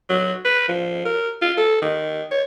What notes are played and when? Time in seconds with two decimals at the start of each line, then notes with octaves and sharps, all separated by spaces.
0.09 F#3
0.45 B4
0.68 F3
1.05 A#4
1.42 F4
1.57 A4
1.82 D#3
2.31 C#5